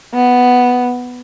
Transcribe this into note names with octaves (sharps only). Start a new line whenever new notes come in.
B3